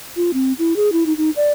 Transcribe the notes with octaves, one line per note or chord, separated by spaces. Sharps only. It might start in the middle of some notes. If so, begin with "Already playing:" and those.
F4
C4
E4
G#4
E4
D#4
D#4
D5